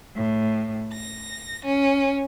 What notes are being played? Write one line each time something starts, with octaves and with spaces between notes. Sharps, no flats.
A2
A#6
C#4